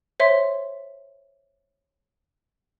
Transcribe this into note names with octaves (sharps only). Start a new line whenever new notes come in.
C5 C#5 E5 C6